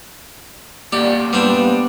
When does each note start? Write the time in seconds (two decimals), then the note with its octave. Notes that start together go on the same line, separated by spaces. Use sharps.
0.93 A#3 G4 D5 F#5
1.33 G3 B3 C4 D4